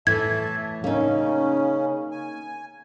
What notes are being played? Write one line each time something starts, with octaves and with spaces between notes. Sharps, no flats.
A2 E3 E5 A5 G#6
C#3 A#3 C#4 D#4
G#5